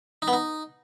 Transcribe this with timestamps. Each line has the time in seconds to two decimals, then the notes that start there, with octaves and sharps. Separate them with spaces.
0.22 D#4
0.28 B3
0.33 D#4